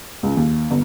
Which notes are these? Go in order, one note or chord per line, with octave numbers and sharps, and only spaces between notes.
C#2
D#2
G1